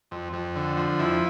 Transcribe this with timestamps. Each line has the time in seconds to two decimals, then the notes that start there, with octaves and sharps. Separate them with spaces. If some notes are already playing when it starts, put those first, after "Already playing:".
0.11 F2
0.33 F2
0.56 D3
0.77 F3
0.99 F2 E4